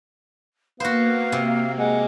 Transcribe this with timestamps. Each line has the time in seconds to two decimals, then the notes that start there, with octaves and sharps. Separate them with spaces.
0.80 A#3 B3 F#4 C5 F5
1.32 C3
1.78 G#3 F#5